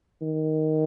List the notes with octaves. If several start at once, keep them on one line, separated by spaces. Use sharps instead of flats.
D#3